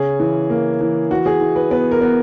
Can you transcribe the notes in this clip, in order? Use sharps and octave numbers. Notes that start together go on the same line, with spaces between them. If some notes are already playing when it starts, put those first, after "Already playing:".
Already playing: C#3 C#4 G#4
E3
A#3
E3
E3 F#4
G#4
E3
B4
B3 B4
A#4
B3